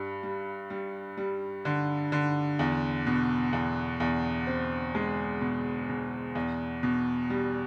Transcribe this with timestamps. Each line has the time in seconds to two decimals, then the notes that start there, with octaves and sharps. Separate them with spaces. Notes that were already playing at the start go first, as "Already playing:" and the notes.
Already playing: G2 G3
0.23 G3
0.70 G3
1.18 G3
1.65 D3
2.12 D3
2.59 E2
3.07 B2
3.53 E2
4.00 E2
4.47 C4
4.95 G#3
5.41 B2
5.89 B2
6.35 E2
6.83 B2
7.30 G3